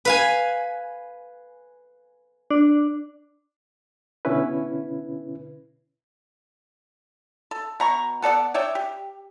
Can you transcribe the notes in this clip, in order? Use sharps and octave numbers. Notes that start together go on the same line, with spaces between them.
B4 F5 G#5
D4
B2 D3 C#4 E4 B4
A4
B2 A#5 C#6
B3 A4 D5 F#5
C#5 D5 E5 G5
G4